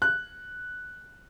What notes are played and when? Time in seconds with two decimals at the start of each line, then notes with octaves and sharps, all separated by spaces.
0.02 F#6